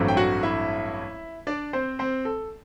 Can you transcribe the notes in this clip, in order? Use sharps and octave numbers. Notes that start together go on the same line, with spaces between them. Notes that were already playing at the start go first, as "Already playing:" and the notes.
Already playing: A1 G2 F#3 A3 C4
G5
F#4 F#5
E4 E5
D4 D5
C4 C5
C4 C5
A4